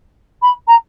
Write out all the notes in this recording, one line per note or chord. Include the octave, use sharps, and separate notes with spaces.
B5
A#5